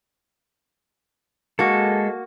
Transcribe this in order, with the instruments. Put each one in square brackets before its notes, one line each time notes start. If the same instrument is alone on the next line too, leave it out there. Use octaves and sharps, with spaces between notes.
[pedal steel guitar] G#3 A4 [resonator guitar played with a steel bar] A#3 F#4